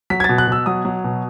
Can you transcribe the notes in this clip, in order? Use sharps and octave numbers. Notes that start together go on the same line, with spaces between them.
F#3 B6
G#6
A6
B2
F#6
B2 E6
F#3 D#6
F#3
B2